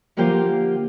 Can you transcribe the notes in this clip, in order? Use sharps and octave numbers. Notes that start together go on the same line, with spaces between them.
D3 F3 A#3 F4 G4 C5